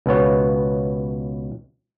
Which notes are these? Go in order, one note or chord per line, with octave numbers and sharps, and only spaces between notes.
C#2 B2 B3 C#5